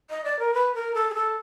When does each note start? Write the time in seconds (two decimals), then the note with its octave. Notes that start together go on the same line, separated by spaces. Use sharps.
0.10 D#5
0.24 D5
0.39 A#4
0.54 B4
0.75 A#4
0.95 A4
1.10 G#4
1.14 A4